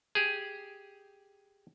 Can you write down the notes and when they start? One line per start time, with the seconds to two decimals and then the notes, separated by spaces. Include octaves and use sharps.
0.15 G4 G#4